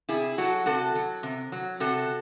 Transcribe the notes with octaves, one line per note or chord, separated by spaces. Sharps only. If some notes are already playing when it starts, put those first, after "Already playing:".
C3 E4 G#4
F#3 F#4 A4
C3 F#4 A4
F#3
C3
F#3
C3 F#4 A4